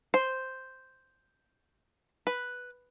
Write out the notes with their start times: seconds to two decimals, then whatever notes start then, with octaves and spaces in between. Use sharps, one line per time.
0.14 C5
2.27 B4